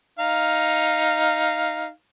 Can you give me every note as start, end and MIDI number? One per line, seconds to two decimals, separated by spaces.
0.19 1.89 63
0.19 1.89 77